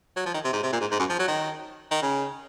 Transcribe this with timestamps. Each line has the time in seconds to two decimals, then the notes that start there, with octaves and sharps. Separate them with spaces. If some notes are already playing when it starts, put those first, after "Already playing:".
0.16 F#3
0.26 F3
0.34 D#3
0.44 C3
0.53 G#2
0.63 C3
0.72 A#2
0.81 G#2
0.91 G#2
0.99 F#2
1.10 F3
1.19 F#3
1.28 D#3
1.91 D#3
2.02 C#3